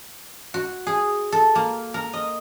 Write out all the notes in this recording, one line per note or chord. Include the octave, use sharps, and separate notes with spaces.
F#4
G#4
A4
A#3
A#4
D#5